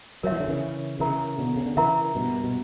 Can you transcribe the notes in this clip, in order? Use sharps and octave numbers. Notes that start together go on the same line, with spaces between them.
F#3 A#4 C#5 E5
E3
D3
C#3 E3
C#3 E3 A#4 E5 A#5
B2 D3
C#3
D3
C#3 E3 A#4 E5 A#5
G2 B2
B2